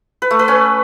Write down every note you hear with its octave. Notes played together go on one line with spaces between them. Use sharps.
B4
A3
B4
C#4